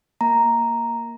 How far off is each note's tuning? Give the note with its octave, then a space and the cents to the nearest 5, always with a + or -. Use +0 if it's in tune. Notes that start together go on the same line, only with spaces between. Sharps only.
A#3 +0 A#5 +0